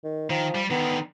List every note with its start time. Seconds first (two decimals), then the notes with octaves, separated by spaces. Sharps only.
0.04 D#3
0.30 D#3 F3
0.55 G3
0.70 D3 D#3 B3